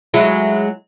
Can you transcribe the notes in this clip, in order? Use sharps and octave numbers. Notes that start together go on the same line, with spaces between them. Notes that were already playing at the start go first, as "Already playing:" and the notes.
F#3 G#3 E4